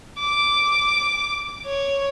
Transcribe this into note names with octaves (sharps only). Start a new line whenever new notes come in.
D6
C#5